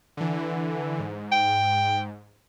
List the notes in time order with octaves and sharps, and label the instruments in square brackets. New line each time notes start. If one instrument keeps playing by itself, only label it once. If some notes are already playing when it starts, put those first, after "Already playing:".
[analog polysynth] D3 E3
G#2
[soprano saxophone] G5